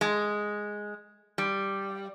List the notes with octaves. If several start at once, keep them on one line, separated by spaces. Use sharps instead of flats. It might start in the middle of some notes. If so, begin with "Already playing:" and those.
G#3
G3